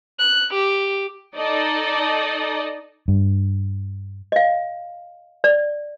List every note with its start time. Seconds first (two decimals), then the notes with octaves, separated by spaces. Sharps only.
0.19 F#6
0.54 G4
1.36 D#4 A4 D5 D#5
3.08 G2
4.32 D#5 F5
5.44 D5